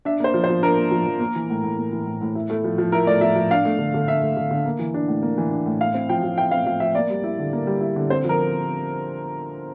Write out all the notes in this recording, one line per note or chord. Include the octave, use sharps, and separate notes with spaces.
D4 E5
A#3 C5
F3
C5
F3
D4 A#4
A#3
F3
F3
A#3
E3
A2
A2
A#3
E3
A2
A2
E4
A3
F3
F3
E4 A#4
A3 D5
F3 E5
F3
D4 F5
A3
D3
D3
D4 E5
A3
D3
D3
A#3
E3
D4
A2
A#3
E3
D4
A2
E4 F5
C4
F3 G5
F3
E4 G5
C4 F5
F3 F5
F3 E5
A#3 D5
G3
E4
D3
A#3
G3
E4
D3
C4 C5
F3 A#4